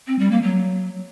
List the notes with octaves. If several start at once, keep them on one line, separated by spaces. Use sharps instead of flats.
C4
G3
A#3
F#3